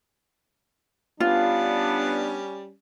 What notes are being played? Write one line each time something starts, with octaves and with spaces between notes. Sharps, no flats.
G3 B3 C#4 D4 F4